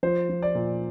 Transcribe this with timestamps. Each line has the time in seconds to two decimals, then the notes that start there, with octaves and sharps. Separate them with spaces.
0.03 F3 C5
0.29 F3
0.43 D5
0.55 A#2